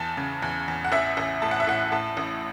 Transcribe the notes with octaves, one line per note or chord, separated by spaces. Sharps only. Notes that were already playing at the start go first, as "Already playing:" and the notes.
Already playing: E2 A5
C#3
E2
E2
F#5
A1 E5
A1
A2 A5
F#5
E5
A2 F#5
A2 A5
A1